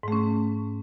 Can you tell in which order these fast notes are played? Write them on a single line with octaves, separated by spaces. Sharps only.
G#2 A3 C#4